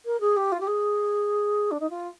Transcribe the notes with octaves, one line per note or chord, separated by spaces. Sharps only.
A#4
G#4
G4
F4
G4
G#4
D4
D#4
F4